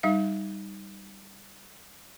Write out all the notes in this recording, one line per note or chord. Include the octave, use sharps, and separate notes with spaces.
G3 D#4 F5